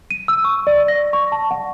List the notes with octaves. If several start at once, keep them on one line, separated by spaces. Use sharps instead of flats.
D#7
E6
C#6
D5
A#6
C#6
A5
F#5